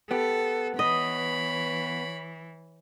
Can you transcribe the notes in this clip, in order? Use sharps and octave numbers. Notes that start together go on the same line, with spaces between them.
B3 G4 A4
E3 C#5 D#5 B5